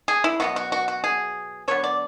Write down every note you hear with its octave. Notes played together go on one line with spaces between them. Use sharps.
G#4
E4
B2 F#3 B3 F#4
F#4
F#4
F#4
G#4
D3 F#3 B3 C#5
D5